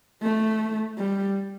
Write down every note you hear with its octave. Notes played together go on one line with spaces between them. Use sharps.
A3
G3